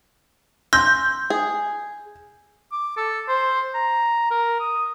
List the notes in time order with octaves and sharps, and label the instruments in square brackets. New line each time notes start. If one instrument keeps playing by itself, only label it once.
[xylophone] C6 E6 A#6 [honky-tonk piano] G6
[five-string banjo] G#4
[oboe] D6
A4
C5
A#5
A#4
D#6